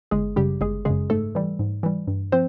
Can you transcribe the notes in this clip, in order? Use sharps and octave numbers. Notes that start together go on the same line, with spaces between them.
G1 G#3 G#4
F#2 C#3 G3 G4
G1 G#3 G#4
F#2 C#3 G#3 G#4
G#2 A3 A4
E3 G3
G#2
E3 G3
G2
F3 C4 C5